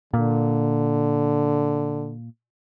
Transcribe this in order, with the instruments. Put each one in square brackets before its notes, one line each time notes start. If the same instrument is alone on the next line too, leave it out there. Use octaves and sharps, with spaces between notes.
[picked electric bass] A#2 [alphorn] D3